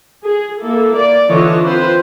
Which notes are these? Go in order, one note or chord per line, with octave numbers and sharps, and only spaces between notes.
G#4
A#3 E4 A4
D5
D3 E3 F4 C#5 D#5 A5
C4 F4 B4 C5